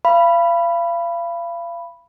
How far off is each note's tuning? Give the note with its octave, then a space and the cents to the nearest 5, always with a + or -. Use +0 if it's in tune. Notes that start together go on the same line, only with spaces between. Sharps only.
F5 -35 B5 +0